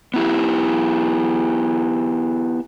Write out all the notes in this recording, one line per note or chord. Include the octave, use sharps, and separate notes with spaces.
B3 E4 G4